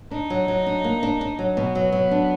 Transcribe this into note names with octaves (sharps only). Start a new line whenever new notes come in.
D4 D#4
F#3
F#3
D4
A#3
D4
D4
F#3
B2 B3
F#3
F#3
D4